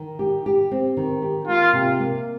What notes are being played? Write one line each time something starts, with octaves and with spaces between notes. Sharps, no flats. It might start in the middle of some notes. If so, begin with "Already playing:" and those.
Already playing: D#3
G4
G4
C4
D#3
G4
A#3 F4
C3
A#3